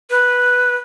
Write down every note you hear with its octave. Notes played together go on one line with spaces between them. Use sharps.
B4